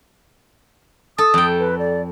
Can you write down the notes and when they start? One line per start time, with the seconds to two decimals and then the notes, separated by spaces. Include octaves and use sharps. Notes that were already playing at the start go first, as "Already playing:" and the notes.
1.18 A4 D#6
1.34 F2 G5
1.59 B4
1.79 D5